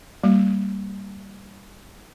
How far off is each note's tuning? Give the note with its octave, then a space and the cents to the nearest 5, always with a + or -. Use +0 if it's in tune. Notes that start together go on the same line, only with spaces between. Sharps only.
G3 +0 A#3 -10